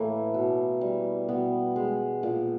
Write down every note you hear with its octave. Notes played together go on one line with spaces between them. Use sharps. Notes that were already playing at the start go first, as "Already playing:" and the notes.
Already playing: A2 E3 A3 A#3
B2
G3
B2 B3
G#3
A#2